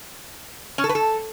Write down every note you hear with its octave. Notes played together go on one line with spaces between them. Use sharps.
C#4
A4
B4
A4